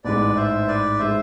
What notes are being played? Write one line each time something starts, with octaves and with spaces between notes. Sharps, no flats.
A1 G#2 G#3 B4 D5
C5 E5
B4 D5
G#3 C5 E5